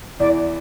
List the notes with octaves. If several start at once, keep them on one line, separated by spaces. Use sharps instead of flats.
E2 E3 D5